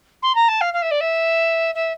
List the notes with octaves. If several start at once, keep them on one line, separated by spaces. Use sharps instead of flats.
C6
A#5
A5
F5
F5
E5
D5
E5
E5